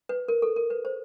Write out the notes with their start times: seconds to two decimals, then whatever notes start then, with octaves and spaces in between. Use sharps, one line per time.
0.09 B4
0.28 A#4
0.42 A4
0.56 A#4
0.70 B4
0.85 C5